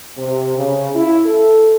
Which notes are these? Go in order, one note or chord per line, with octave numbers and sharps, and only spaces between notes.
C3
C#3
E4
A4